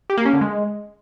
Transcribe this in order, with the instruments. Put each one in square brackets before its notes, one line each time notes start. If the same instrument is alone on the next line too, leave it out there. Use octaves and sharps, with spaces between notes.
[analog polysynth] G4
A#3
C#4
D3
G#3